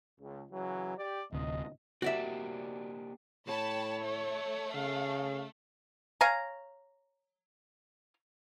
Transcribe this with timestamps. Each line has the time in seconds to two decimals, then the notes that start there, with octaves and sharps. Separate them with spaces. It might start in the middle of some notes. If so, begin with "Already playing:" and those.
0.20 C#2
0.50 C#3 E3 F#3
0.96 G4 D5
1.32 D1 D2 C3 D#5
2.02 A#3 D4 F#4 G4 D5 E5
3.47 A2 C#5 G5 A5 B5
3.99 A3
4.74 C#3 F5
6.21 C#5 F5 G#5 A#5